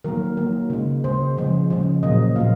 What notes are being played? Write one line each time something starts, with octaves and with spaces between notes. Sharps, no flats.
D#3 F#3 A#3 A#4
D#3 F#3 A#3
C#3 G#3
C#3 G#3 C5
C#3 F3 G#3
C#3 F3 G#3
A#2 F#3 A#3 D#5
A#2 F#3 A#3 F5